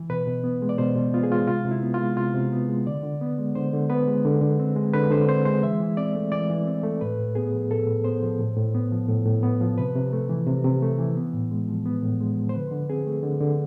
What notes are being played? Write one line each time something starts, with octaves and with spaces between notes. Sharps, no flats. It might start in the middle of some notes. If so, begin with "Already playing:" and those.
Already playing: E3
B2 B4
B2
B3
G#3
D5
B2 C5
B2
B3 F4
G#4
G#3 F4
C3 F4
C3
E4
B3
F4
G#3
C3 F4
C3
B3
G#3
D3 D5
D3
B3
G#3
D3 C5
D3
B3 B4
G#3
D3
D3
C4
G#3
D3 B4
D3 C5
C4 C5
G#3 C5
E3 E5
E3
C4 D5
A3
E3 D5
E3
C4
A3
A2 B4
A2
B3 G#4
F3
A2 A4
A2
B3 C5
F3
A2
A2
B3
F3
A2
A2
B3
F3
C3 B4
C3
A3
E3
C3
C3
A3
E3
B3
A2
G#3
F3
B3
A2
G#3
F3
C5
D3 B4
D3
C4 G#4
A3
D3
D3